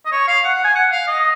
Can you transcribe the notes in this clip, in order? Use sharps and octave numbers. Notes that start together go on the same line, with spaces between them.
D#5
C#5
F5
F#5
F#5
G#5
F#5
F5
D#5